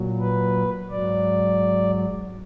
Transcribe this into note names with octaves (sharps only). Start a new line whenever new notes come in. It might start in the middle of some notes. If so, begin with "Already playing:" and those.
Already playing: A#2 F#3
B4
G#2 F#3 D5